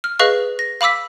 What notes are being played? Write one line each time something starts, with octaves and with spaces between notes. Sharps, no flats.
F6
G#4 B4 D#5 F5 C#6 F#6
A#6
F5 B5 D6 E6 B6